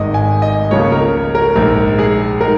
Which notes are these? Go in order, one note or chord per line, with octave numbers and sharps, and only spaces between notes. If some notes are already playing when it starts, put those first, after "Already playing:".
Already playing: G#1 G#2 D#3 G#3 D#4 D#5
G#5
D#5
C#2 C#3 F3 A#3 C#5
A#4
A#4
A#1 G#2 G#3 A#4
G#4
G#3 D#4 A#4